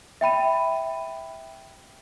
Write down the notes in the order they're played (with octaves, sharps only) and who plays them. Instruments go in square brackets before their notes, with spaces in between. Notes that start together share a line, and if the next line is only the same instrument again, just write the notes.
[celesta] E5 G5 B5 D#7